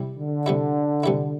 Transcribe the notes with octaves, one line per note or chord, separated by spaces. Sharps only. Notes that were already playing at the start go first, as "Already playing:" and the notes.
Already playing: C3 G3 E4
D3
C3 G3 E4
C3 G3 E4